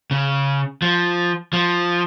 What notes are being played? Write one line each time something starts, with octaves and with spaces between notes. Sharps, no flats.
C#3
F3
F3